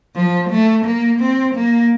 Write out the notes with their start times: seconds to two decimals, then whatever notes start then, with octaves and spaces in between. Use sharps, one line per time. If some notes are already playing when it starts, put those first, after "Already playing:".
0.15 F3
0.50 A3
0.86 A#3
1.21 C4
1.55 A#3